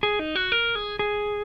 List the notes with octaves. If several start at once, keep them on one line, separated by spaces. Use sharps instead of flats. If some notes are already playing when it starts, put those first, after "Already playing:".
G#4
D#4
F#4
A#4
G#4
G#4